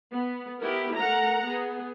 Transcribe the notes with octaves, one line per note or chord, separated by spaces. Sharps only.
B3
B3 E4 G4 A#4
A3 A#4 F#5 A#5
B3 G#4